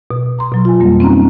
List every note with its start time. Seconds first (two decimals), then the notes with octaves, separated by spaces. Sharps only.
0.11 B2
0.39 A#5 C6
0.52 B2 F#3
0.65 F4 G#5
0.80 F2 G3 A#3
1.00 C4 C#4 D#4 A#5